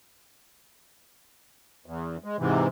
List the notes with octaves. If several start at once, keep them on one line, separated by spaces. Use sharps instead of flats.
E2
G#3
G#2 C3 E3